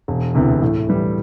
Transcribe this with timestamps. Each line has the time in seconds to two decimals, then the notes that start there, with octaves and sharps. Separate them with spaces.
0.08 E1
0.35 D2 C3 E3 B3
0.62 A2
0.89 E3 G3